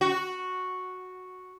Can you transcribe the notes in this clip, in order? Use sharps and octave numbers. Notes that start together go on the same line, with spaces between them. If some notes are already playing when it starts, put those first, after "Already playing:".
F#4